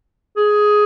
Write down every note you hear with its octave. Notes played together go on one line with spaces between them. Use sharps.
G#4